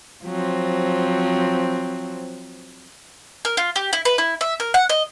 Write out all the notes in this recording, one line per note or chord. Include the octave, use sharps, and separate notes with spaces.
F3 F#3 C4
A#4
F4
G4
E4
B4
E4
E5
A#4
F#5
D#5